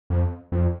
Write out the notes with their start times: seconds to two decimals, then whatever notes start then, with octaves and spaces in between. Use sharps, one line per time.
0.10 F2
0.52 F2